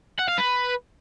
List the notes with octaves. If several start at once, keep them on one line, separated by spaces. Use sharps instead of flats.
F#5
F5
B4